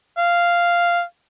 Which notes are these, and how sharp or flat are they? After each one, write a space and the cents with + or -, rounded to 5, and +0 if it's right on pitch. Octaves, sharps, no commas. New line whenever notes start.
F5 -5